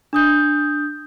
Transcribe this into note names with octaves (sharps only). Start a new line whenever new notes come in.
D4 D#6 G6